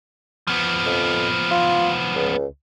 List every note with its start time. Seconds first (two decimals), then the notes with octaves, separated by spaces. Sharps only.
0.48 F3 B3
0.86 F2
1.51 F4
2.15 C#2